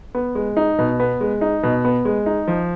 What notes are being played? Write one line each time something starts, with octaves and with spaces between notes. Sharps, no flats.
B3
G#3
D#4
B2
B3
G#3
D#4
B2
B3
G#3
D#4
F3